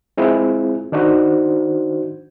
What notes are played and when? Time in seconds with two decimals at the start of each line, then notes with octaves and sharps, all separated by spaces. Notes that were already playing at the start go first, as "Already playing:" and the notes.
0.17 G#3 C4 E4 F4 G#4
0.92 D#3 D4 D#4 F#4 C5